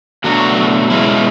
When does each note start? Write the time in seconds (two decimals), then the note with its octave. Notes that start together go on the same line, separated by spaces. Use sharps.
0.24 B2 F#3 A3 D4 F#4
0.90 B2 G#3 C#4 E4